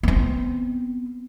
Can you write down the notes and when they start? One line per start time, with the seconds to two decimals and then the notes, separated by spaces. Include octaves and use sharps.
0.03 B3 C4